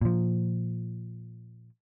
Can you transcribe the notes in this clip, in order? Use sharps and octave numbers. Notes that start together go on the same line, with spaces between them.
A#2 F3